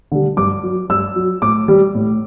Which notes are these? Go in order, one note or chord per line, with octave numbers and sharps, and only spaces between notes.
D3 G3
G2 D6
F#3
G2 E6
F#3
A2 D6
G3
A2